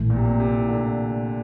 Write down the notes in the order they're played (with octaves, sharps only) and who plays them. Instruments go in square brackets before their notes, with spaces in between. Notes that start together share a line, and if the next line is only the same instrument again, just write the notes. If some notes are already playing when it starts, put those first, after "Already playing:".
Already playing: [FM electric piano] A#1 A2 E3 A3
[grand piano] A#2
C3
A#2
C3
D3